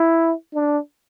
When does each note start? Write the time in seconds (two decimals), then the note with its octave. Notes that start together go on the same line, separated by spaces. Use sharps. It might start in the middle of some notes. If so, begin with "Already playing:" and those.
Already playing: E4
0.53 D4